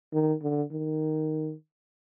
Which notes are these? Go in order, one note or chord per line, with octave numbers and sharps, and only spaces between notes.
D#3
D3
D#3